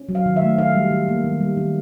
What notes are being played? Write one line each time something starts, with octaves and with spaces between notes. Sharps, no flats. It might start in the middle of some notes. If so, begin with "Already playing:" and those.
Already playing: C#4
F#3
F5
D#3
E5
A3
D#3 F5
G3
D#3
A#3
D#3
G3
D#3